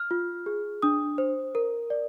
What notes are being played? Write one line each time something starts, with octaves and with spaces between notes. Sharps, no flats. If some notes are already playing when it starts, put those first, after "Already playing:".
Already playing: F6
F4
G#4
D4 D#6
C5
A#4
D5